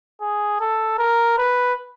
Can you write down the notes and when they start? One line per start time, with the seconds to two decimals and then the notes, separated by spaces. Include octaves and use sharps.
0.21 G#4
0.60 A4
0.98 A#4
1.38 B4